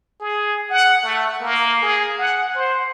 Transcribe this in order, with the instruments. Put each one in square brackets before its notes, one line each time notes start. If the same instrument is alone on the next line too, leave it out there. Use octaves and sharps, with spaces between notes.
[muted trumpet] G#4
F#5
A3
A#3
G#4
F#5
C5